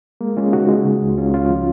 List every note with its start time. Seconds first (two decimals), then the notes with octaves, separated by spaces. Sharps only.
0.21 G#3 A#3
0.37 G#3 C#4 F4
0.53 C#3 D#4 F#4
0.69 G#3
0.85 C#3
1.02 C#2
1.18 C#2 C#4 F4
1.34 C#2 C#4 F4
1.49 F3